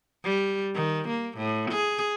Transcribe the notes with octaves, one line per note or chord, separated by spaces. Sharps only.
G3
D#3
A#3
A2
G#4